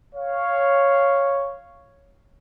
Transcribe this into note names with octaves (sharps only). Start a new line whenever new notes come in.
C#5 F5